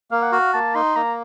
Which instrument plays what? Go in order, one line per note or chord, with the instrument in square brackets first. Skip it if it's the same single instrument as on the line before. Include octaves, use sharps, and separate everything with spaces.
[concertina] A#3 [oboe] F5
[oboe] F#5
[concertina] F#4 [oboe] F5
[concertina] A#3 [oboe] A5
[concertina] D#4 [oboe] C6
[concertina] A#3 [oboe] A#5